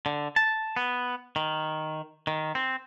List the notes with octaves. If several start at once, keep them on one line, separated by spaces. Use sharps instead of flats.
D3
A5
B3
D#3
D#3
C4